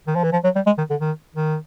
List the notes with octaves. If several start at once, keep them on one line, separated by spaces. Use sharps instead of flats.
D#3
F3
E3
F3
F#3
G3
G#3
D#3
D3
D#3
D#3